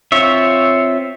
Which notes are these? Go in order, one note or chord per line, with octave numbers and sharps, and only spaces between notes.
C4 F4 C#5 E5